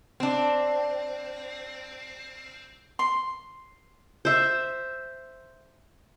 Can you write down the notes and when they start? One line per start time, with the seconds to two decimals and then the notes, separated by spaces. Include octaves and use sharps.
0.20 C4 D4
2.99 C6
4.25 C5 E5